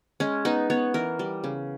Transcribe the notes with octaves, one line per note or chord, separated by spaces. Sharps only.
G#3 C#4
B3 D#4
B3 C#5
E3 A#4
G3
C#3